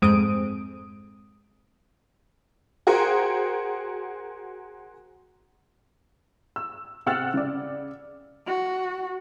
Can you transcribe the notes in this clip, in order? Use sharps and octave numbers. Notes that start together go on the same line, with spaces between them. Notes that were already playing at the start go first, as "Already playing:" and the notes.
F2 G#2 G#3 C4 D#6 D7
F#4 G#4 A#4 C5 F#5 G5
E6
C3 F#5 G5 E6 F6 A6
C#3 D5
F#4